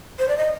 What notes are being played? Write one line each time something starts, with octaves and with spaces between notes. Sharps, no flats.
C5
D5
D#5